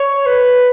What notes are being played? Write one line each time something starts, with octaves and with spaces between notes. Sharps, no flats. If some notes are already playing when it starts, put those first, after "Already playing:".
Already playing: C#5
B4